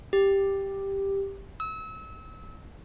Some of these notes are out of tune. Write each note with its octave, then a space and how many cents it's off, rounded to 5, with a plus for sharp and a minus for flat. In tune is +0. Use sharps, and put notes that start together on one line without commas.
G4 +5
E6 -30